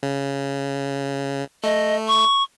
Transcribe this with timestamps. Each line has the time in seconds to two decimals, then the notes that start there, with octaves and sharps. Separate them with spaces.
0.03 C#3
1.64 A3 D#5
2.08 C#6